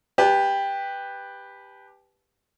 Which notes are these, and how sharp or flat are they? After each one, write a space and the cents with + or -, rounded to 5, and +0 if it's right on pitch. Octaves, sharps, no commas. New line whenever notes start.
G4 +10 B4 +0 A5 -35